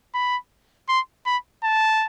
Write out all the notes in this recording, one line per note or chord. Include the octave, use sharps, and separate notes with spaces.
B5
C6
B5
A5